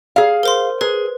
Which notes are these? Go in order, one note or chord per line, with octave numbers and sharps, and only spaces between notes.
G#4 F5
A#4 C5 C6
G#4 B4